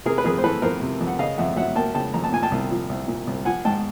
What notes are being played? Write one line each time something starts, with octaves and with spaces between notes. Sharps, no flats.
C3 G#4 A#4
B4
F2 G#4 A#4
C5
E3 A4 B4
F2 A#4 C5
C3
F2
F#5
C#3 D#5 F5
F2 E5 F#5
F#3 E5 F#5
A#3 G5 A5
C#3 G5 A5
F2 A#5
A5
A#2 G#5
G5 A5
C2
F3
C2
A#2
C2
F3 F#5 G#5
G#2 G5 A5